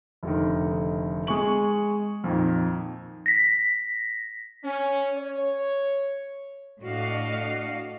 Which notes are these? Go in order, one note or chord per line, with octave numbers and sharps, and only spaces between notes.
F1 D3 D#3
G#3 G#4 C#6 F#7
F2 A#2 D#3
A#6 B6
C#4
C#5
A2 D4 F#4 D#5 F5